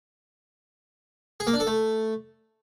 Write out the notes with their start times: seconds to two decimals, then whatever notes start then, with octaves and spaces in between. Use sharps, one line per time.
1.40 G#4
1.47 A#3
1.54 D4
1.60 A4
1.67 A3